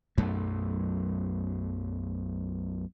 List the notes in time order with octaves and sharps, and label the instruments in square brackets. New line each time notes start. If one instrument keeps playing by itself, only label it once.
[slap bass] B1 F#2 A3